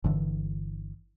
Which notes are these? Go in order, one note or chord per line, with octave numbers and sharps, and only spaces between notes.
G1 D3 E3